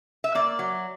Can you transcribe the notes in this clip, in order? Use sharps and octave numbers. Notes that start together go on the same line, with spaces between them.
E5
A#3 D5
F#3